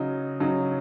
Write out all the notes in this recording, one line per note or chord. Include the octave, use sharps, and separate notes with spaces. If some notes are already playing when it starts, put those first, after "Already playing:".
Already playing: C#3 F#3 D#4
C#3 F#3 D#4